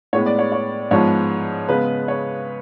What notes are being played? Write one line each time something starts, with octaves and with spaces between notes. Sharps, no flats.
A2 G#3 B3 C#5
D5
C#5
C#5
G#2 F3 G#3 B3 C#5
C#3 G#3 B3 B4
C#5